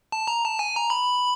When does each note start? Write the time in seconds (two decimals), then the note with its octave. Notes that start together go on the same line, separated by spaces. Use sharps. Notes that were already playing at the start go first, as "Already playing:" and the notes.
0.12 A5
0.28 A#5
0.44 A5
0.59 G#5
0.76 A#5
0.90 B5